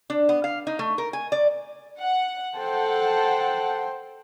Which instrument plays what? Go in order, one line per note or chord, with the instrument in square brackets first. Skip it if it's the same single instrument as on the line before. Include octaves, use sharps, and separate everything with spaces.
[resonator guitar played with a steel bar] D4
B3
F5
D#4
A3
A#4
G#5
D5
[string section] F#5
[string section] A4 F#5 [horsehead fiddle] C5 G5